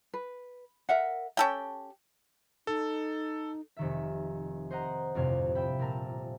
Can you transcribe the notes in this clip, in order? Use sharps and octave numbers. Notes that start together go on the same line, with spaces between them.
B4
A#4 E5 F#5
C#4 G4 A4 G5
D#4 A4
F1 D#3 E5
C5 D#5 F#5 A#5
G1 F2 A2 C3 F5 G#6
E5 G5 B5
A#2 G4 A#4 A5